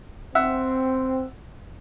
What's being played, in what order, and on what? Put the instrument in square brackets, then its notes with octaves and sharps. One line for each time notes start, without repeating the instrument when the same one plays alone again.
[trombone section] C4 [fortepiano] E5 F#5